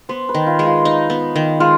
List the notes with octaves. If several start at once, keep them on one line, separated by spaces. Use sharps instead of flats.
B3 C5
B4
D#3
F4
G#3
F4
D#4
B3
D#3
G#3 F4